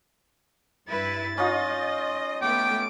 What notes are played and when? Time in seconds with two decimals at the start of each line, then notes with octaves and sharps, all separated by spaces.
0.88 G2 E4 B4 A6
1.38 C#4 D#4 F4 D#5
2.42 A3 B3 G5 D6 D7